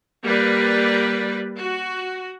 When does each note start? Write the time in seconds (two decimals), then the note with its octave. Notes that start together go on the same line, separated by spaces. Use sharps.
0.24 G3 A#3 B4 D5
1.60 F#4